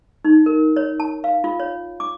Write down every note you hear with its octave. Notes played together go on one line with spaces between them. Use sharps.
D#4
A#4
C#5
A5
F5
F4
C#5
D6